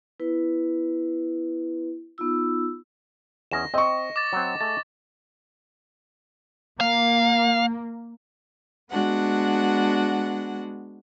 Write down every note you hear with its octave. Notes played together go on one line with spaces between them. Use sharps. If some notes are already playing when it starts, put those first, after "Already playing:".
B3 E4 B4
B3 D#4 F4 E6
E2 C#4 D#5 A#6 E7
C4 D#5 C#6
D6 A6
F#3 C4
A3 G#4 A6
A#3 F5
G#3 B3 D4 F#4 F#5